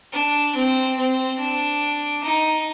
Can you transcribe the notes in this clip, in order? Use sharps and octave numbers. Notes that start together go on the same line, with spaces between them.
D4
C4
C4
D4
D#4